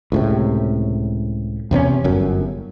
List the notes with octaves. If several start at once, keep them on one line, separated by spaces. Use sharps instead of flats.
C#2 A2 C3
E2 C3 C4 C#4
G1 F#2